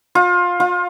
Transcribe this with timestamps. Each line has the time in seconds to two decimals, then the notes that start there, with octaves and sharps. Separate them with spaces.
0.15 F4
0.60 F4